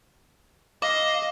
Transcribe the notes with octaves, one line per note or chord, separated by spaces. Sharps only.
D#5 F5 D6